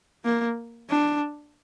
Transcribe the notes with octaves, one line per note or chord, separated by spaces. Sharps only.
A#3
D4